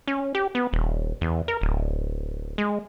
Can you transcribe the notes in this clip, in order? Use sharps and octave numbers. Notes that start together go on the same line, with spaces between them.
C#4
G4
B3
D#1
E2
A#4
D1
G#3